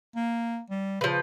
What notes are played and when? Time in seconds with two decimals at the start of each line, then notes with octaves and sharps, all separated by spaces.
0.16 A#3
0.70 G3
1.01 C#3 F3 B4